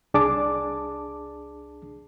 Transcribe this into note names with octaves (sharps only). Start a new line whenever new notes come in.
C2 D4 G#4 A5 D6